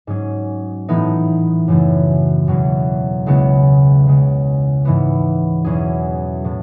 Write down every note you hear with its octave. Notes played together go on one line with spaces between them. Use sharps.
G#2 F#3 C#4 G#4
A2 E3 B3 D#4
F#2 C#3 E3 A3 E4
E2 B2 F#3
C#2 C#3 G#3 B3 E4
C#2 C#3 G#3
G#2 E3 B3
E2 B2 F#3 C#4 G#4
A2 F#3 A3